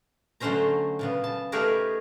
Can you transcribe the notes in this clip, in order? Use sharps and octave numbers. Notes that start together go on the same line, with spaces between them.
D3 F#3 A3 C#4 C5 A#5
A#2 C#3 B3
A5
A3 D#4 G4 G#4 A#4 B4